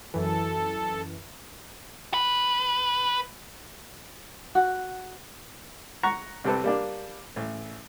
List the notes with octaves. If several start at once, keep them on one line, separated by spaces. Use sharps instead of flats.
F#2 E3 A4
B4
F#4
F#5 A#5 C#6
C2 C3 C4 A4 B4
G3 A#3 D4
A1